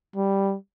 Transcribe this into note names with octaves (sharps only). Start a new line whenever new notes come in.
G3